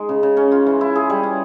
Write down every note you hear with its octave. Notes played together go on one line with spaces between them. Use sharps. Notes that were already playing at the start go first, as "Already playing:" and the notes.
Already playing: G#3 D#4
C#3
C#3
C#4
F4
E3
E4
G#4
G3
C#4